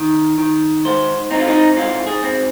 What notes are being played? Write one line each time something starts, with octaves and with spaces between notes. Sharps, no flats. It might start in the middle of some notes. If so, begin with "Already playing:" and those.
Already playing: D#3
D#3
G#2 C5
C4 D#4
F4
D#4
G#2 F4
G#4
C4